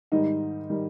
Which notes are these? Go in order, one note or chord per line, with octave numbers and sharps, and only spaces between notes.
G#2 D#3 G3 D#4
D#3 G3